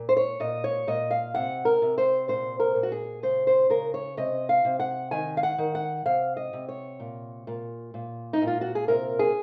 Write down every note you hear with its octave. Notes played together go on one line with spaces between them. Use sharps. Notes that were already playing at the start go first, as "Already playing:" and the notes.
Already playing: A#2
C5
C#5
A#2 D#5
C#5
A#2 D#5
F5
C3 F#5
A#4
C3
C5
A#2 C5
A#4
A#2
F#4
G#4
C#3 C5
C5
C#3 A#4
C#5
C3 D#5
F5
C3
F#5
D#3 G#5
F5
F#5
D#3
F#5
C3 F5
D#5
C3
C#5
A#2
A#2
A#2
D#4
A#2
F4
F#4
G#4
C3 A#4
G#4